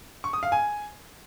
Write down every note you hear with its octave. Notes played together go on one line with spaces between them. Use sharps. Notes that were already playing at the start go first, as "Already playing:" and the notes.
C#6
D#6
F5
G#5